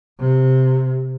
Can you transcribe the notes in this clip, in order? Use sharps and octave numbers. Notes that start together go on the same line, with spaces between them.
C3